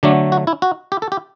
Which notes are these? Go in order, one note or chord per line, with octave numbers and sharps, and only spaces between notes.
D3 F#3 A3 D4
F#4
E4
F#4
G4
A4
G4